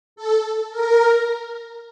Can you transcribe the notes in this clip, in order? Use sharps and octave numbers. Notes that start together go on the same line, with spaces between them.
A4
A#4